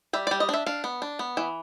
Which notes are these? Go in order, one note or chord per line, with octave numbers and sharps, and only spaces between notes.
G3 E5
G3 D5
D#5
D4 E5
D4 F5
B3
D4
B3
E3